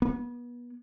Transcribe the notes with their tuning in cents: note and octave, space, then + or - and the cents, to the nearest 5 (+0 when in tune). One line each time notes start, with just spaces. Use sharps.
B3 -30